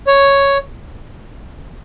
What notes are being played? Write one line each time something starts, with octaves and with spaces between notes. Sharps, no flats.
C#5